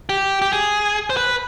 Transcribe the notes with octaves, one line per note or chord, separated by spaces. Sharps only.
G4
G4
G#4
C5
B4